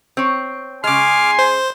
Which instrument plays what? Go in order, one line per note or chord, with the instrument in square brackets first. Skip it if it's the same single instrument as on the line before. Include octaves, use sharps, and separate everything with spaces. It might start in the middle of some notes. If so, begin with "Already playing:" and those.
[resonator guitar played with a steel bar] C4 C#5
[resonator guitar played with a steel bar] C#3 G#3 [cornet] G#5 [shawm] C6 [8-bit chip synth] D6 F6
[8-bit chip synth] C5